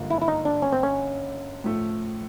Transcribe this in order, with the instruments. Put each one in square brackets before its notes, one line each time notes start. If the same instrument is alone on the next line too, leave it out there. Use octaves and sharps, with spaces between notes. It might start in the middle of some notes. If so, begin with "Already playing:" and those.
Already playing: [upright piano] G#1 G2 D3 F3 A#3
[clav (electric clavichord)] E4
E4
D#4
D4
C#4
C4
C#4
[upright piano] A2 F3 A3